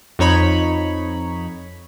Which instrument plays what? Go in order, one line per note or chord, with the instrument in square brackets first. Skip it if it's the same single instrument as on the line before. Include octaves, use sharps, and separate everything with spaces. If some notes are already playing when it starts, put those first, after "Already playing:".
[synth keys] F2 D#4 C#5 B5